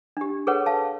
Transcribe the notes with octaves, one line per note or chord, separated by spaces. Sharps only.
D4 G4
G#4 A4 B4 C#5 F#5
F5 A5